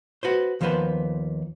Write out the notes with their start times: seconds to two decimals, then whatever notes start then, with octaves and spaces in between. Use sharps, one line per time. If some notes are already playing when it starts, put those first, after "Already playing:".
0.23 F#4 B4 C5
0.61 D#2 F3 A#3 B3 B4 C5